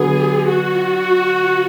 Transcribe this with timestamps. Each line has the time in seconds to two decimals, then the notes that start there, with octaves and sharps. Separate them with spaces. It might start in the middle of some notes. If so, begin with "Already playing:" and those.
Already playing: D3 F#3 B3 G#4
0.48 F#4